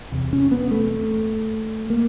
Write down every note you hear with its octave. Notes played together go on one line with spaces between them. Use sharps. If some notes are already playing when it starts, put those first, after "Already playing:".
E2 C3
C#4
B3
A3
A#3